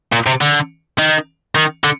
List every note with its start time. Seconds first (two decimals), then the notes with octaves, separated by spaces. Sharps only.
0.13 A#2
0.27 C3
0.41 D3
0.98 D#3
1.55 D#3
1.84 D3